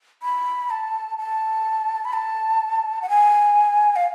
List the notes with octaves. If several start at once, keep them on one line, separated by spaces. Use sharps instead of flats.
B5
A5
A5
B5
A5
F#5
G#5
F5